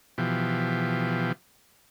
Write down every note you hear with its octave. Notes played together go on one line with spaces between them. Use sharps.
B2 E3 F3 G4